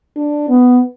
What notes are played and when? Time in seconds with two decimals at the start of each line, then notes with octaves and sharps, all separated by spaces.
0.16 D4
0.49 B3